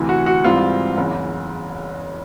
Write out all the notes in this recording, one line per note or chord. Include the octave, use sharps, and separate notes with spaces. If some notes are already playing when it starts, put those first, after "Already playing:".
Already playing: D2 C3 E3
F#4
F#4
G#2 E3 G3 C4 F4
F#1 E2 C#3